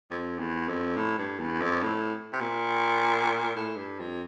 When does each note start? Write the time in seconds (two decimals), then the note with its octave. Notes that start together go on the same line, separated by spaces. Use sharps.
0.11 F2
0.39 E2
0.69 F2
0.97 A2
1.18 G2
1.39 E2
1.61 F2
1.82 A2
2.33 C3
2.40 A#2
3.56 A2
3.76 G2
3.99 F2